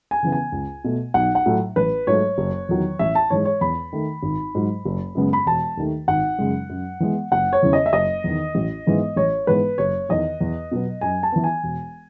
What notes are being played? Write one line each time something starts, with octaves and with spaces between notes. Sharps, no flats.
G#5
C#3 E3 B3
G#5
C#2
B2 A3
B1 F#5
F#5
A2 F#3 A3
A1 B4
G#2 F#3 A3 C#5
F#1
E2 D#3 F#3
A1 E5
A5
G#2 E3 G#3 C#5
C#5
E2 B5
D#3 A3
G#1
G#2 F#3
F#1
F#2 C#3 G#3 B3
B5
E1 A5
D#2 D#3 A3
G#1 F#5
F#2 C#3 G#3
F#2
E3 G#3 B3
F#1 F#5
C#5
E2 C#3 E3
D#5
E5
F#1 D#5
E2 D#3
A1
G#2 E3 G#3 B3
A1 C#5
G#2 E3 G#3 B3 B4
F#1 C#5
E2 D#3 D#5
E2
B2 F#3 B3
F#2 G#5
A5
E3 B3
G#5
E1